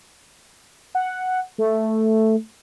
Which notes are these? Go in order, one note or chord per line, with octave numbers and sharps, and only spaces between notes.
F#5
A3